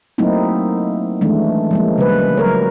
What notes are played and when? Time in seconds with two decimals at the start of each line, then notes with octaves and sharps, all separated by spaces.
0.18 F#3 A3 A#3 C4 D#4 E4
1.21 D#3 E3 G#3 A3 D4
1.71 F3 G#3 A#3
1.98 C#3 G3 B4
2.37 F#3 A#4 C#5